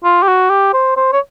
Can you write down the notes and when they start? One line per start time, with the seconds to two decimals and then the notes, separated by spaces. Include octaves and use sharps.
0.04 F4
0.23 G4
0.28 F#4
0.50 G4
0.74 C5
0.97 C5
1.13 C#5